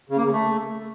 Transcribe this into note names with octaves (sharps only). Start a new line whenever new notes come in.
C#3
A#3
C#3
A3